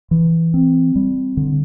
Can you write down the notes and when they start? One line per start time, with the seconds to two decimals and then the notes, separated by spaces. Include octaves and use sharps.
0.11 E3
0.54 C4
0.96 G3
1.37 D3